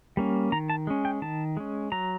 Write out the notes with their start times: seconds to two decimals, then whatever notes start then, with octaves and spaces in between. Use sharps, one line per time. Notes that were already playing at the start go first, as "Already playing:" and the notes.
0.17 G3 A#3 C#4
0.52 D#3 A#5
0.70 A5
0.87 G#3 C#4
1.05 G5
1.22 D#3 A5
1.57 G#3 C#4
1.92 F#3 A#5